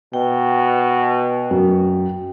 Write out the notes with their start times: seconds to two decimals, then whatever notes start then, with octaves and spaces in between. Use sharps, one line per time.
0.13 B2 G5
1.51 F#2